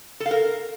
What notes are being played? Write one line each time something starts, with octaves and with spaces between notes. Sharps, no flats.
A4
F5
A#4